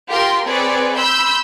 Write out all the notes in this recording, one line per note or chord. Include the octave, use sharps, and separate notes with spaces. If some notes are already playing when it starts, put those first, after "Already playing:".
F4 G4 A#4 G5 C6
C4 G#4 B4 C#5 D5
B5 C6 E6 G6